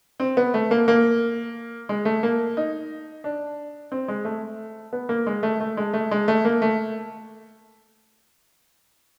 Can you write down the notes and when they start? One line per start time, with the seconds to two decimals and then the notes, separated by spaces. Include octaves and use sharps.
0.20 C4
0.37 B3
0.54 A3
0.71 A#3
0.88 A#3
1.89 G#3
2.05 A3
2.23 A#3
2.57 D#4
3.24 D4
3.92 C4
4.08 G#3
4.25 A3
4.93 B3
5.09 A#3
5.27 G#3
5.43 A3
5.60 A3
5.77 G#3
5.93 A3
6.11 G#3
6.28 A3
6.45 A#3
6.62 A3